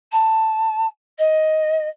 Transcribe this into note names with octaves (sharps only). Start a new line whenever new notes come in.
A5
D#5